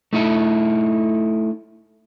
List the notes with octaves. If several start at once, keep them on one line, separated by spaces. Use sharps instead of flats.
A3 D#4 E4 A4